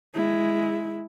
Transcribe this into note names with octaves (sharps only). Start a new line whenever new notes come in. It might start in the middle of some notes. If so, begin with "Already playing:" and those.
G#3 E4